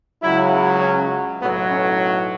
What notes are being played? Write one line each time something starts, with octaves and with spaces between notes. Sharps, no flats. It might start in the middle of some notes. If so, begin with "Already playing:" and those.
C#2 C#3 F#3 E4
C#4
B1 A2 F#3 B3
C#4